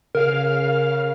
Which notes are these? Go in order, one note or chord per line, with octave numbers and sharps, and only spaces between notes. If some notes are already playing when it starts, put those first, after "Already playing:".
C#3 A#4 F5 F6